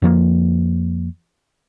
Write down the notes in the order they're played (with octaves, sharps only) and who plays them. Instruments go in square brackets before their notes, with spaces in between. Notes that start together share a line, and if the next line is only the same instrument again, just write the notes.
[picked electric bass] F2 F3 G3 A#3